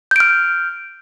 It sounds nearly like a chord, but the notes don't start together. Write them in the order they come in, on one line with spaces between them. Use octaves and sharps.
G6 D7 F6